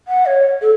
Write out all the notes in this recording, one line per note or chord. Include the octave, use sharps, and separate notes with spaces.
F#5
C#5
A4